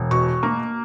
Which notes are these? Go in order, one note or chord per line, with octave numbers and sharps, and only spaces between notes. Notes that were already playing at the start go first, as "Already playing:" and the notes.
Already playing: E1
B2 C#6
A#3